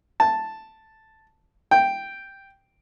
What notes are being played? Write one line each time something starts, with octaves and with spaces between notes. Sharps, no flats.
A5
G5